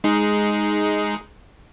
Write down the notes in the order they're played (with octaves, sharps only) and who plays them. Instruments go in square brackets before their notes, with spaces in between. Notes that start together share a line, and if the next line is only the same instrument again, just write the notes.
[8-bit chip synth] G#3 D#4 G#4